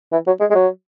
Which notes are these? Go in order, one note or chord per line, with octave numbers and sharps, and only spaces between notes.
E3
F#3
G#3
G#3
F#3